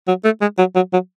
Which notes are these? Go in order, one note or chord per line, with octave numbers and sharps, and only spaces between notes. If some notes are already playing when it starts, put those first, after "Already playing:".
F#3
A3
G#3
F#3
F#3
F#3